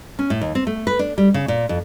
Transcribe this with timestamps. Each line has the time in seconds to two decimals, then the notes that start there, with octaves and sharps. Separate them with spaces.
0.19 C#4
0.30 A2
0.41 D#2
0.55 C4
0.67 A3
0.87 B4
0.99 D4
1.18 G3
1.34 C#3
1.48 A#2
1.69 F2